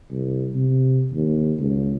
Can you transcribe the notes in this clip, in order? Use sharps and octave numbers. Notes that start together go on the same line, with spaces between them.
C2
C3
D#2
C#2